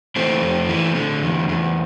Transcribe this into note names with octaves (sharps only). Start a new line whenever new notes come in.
E3 A3 C4
F2
E3
D3
E2
E2